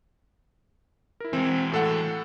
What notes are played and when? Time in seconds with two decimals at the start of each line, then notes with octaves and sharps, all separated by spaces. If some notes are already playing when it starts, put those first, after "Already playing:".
1.20 E4 A#4
1.33 E3 G#3 C4
1.71 A2 A4 F#5